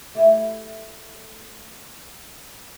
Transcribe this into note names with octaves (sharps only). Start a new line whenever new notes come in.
A3 E4 G4